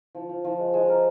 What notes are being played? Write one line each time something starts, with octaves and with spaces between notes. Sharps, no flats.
F3
F3
F3
G#3
G#3
A#4